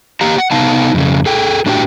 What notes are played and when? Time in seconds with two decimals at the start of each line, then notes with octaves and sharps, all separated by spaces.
0.21 A#3 G4 F5 A#5
0.38 F#5
0.51 C3 B3 D#4 F5 A5
0.94 F2 C#3
1.26 G#4 A4 G5
1.66 A2 D4 F#4 G4 D5 G5